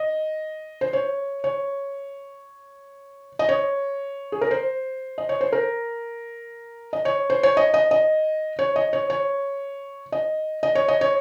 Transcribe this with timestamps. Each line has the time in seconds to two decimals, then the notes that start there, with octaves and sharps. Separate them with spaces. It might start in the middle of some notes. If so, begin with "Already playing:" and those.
Already playing: D#5
0.81 C5
0.93 C#5
1.44 C#5
3.39 D#5
3.49 C#5
4.32 G#4
4.41 A#4
4.51 C5
5.18 D#5
5.29 C#5
5.41 C5
5.52 A#4
6.93 D#5
7.05 C#5
7.30 C5
7.43 C#5
7.57 D#5
7.74 D#5
7.91 D#5
8.59 C#5
8.76 D#5
8.93 C#5
9.10 C#5
10.12 D#5
10.63 D#5
10.75 C#5
10.88 D#5
11.01 C#5